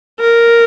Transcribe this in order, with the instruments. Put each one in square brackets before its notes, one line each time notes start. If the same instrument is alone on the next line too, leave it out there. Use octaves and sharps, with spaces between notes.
[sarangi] A#4